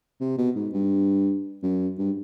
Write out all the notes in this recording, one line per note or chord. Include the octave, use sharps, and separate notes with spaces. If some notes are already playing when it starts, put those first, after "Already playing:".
C3
B2
G#2
G2
F#2
G2